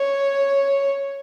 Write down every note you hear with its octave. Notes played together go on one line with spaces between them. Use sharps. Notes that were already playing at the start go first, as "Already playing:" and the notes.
Already playing: C#5